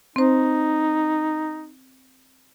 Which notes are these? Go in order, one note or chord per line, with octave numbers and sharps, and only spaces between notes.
C4 D#4 C5